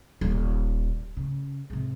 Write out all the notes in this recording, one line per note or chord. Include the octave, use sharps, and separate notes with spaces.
D#1
C#3
G#2 C3